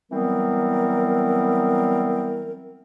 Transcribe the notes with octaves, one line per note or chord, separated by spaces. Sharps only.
E3 F#3 G3 B3 C4 A#4